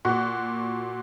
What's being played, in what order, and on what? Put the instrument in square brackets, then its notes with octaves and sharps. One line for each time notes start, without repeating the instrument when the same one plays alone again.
[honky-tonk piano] A#2 [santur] F#4 D6